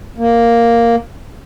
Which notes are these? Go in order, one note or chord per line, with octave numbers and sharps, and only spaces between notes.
A#3